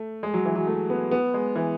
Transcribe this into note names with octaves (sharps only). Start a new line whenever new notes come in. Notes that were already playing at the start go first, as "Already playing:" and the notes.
Already playing: A3
G#3
F#3
E3
F#3
A3
B3
B3
G#3
E3